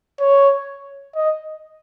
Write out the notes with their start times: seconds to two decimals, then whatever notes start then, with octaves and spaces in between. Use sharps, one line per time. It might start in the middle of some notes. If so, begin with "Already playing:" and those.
0.20 C#5
1.16 D#5